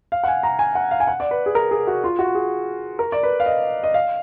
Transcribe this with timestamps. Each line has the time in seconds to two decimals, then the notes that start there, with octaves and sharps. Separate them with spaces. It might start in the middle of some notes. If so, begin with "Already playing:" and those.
0.12 F5
0.24 F#5
0.28 G#5
0.43 A#5
0.59 G#5
0.75 F#5
0.91 F5
1.00 G#5
1.07 F#5
1.20 D5
1.31 B4
1.46 G#4
1.55 A#4
1.71 G#4
1.87 F#4
2.04 F4
2.19 F#4
2.35 G#4
2.99 A#4
3.12 D5
3.23 B4
3.40 F5
3.46 D#5
3.84 D#5
3.94 F5